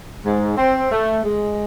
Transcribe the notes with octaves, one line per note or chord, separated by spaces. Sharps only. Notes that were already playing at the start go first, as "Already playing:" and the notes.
G#2
C4
A3
G#3